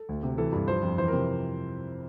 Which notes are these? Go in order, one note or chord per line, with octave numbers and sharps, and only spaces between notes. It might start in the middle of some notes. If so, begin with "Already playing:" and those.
Already playing: A4
D2
C3
E3 A4
G2
F3 C5
F2
E3 C5
A#4
C3